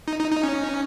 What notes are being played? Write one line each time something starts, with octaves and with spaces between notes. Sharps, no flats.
D#4
D#4
D#4
C#4